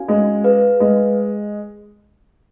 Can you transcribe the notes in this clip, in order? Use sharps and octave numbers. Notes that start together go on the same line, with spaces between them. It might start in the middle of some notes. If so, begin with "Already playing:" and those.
Already playing: C#4 F#4 A#4 F5 G#5
G#3
G#4 B4 F5
G#3